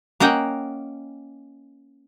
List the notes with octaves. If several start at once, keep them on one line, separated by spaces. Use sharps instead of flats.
A#3 C#4 D#5 F#5 G5